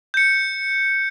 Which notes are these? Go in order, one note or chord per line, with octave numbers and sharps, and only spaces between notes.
G6 C#7